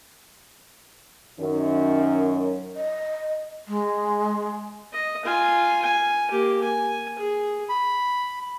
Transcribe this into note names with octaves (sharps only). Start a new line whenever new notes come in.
F#2 D#3 C#4
D#5
G#3
D#5
F4 G#5
G#5
A#3 G4
G#5
G#4
B5